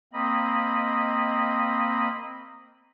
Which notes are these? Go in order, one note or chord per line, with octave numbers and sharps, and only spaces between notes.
A#3 C4 D#5 B5